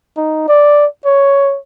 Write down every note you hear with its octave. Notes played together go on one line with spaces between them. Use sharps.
D#4
D5
C#5